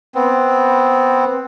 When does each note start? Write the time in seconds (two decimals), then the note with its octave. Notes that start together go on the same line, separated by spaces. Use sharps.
0.15 B3 C4